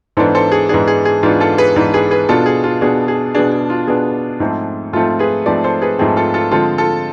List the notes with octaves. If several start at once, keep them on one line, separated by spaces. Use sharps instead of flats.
G#2 E3 B3 D4 A4 C5
A4 C5
G#4
G#2 E3 B3 D4 G#4
G#4
G#4
G#2 E3 B3 D4 F4
F4 A4
G#4 B4
G#2 E3 B3 D4
G#4 B4
G#4 B4
B2 B3 D4 F4 A4
G#4
F4
B2 B3 D4 G#4
G#4
B2 B3 D4 G#4
G#4
F4
B2 B3 D4 G#4
G#2 F3 A3 C4
G#2 F3 A3 C4 F4 A4
G#4 B4
G#2 F3 A3 C4 B4 D5
A4 C5
G#4 B4
G#2 F3 A3 C4 G#4
F4 A4
F4 A4
D3 F3 G#3 C4 F4 A4
F4 A4